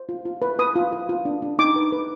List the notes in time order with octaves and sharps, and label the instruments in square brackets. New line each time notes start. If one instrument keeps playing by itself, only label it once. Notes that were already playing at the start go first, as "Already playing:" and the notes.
Already playing: [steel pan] C5
F4
F4
B4
B4 D#6
F4
B4
F4
D4
D4
D#4 D6
B4
B4